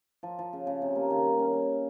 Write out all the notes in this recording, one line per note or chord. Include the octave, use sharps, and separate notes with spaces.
F3
F3
C#3
C#3
C3
A#3
D#3
G3
C#4
C#4